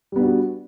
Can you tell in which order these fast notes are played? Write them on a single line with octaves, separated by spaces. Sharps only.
G3 B3 D4 F#4